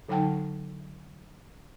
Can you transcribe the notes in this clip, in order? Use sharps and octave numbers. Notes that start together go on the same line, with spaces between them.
D3 F#3 D#4 F#5 G5 A5